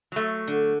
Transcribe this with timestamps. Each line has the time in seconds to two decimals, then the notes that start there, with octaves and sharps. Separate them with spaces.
0.12 F#3 A3
0.47 D3